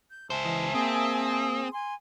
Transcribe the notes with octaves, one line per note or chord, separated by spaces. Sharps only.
G6
C#2 C5 E5 G#5 A5
E3 D#5
A#3 C4 G#4 D#6
G#5 C6